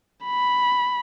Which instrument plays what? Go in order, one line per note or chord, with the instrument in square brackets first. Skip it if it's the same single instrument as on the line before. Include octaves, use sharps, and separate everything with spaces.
[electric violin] B5